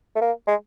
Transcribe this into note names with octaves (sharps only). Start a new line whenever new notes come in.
A3
A#3
G#3